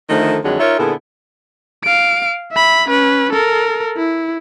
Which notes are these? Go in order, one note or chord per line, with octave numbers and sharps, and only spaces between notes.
D3 D#3 F3 A3
F2 D3 D#3 F#3 G#3
D#4 F4 A#4 C#5 E5
A#2 D3 B3 E4 G#4 A4
F5 D7
E5 B5
C#4 B4
A4 A#4
E4